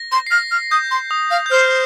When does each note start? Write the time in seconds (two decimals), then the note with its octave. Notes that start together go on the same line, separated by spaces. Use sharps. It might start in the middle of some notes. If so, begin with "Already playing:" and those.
Already playing: A#6
0.12 C6
0.27 C7
0.31 F6 A#6
0.51 F6
0.71 D#6 G6
0.91 C6
1.11 D#6
1.31 F5
1.46 G6
1.51 C5 F6